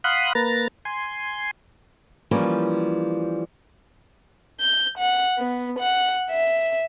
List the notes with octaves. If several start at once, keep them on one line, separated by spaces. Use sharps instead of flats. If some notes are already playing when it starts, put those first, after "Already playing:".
F5 F#5 B5 C6 D#6 F#6
A#3 B4 A#5 A6
G#5 C6
E3 F3 G3 A#3 C#4
G6
F#5
B3
F#5
E5